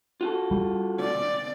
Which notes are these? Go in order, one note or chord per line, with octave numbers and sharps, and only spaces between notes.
F4 F#4 A4
G3
D5